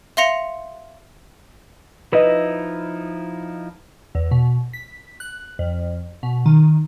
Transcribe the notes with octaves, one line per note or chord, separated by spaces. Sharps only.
E5 F5 C6 A#6 C#7 F7
F3 D#4 E4 B4 D#5
E2
B2
B6
F#6
F2
B2
D#3